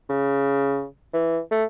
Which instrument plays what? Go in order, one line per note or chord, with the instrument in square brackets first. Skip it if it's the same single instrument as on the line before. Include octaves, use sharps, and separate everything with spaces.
[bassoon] C#3
E3
A3